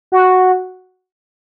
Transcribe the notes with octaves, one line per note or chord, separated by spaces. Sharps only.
F#4